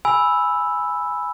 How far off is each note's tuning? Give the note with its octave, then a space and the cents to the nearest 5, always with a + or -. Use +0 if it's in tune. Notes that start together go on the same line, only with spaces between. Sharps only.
G#5 +0 B5 +0 E6 +0